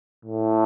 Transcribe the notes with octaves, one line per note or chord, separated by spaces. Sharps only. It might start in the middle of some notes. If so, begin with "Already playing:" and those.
A2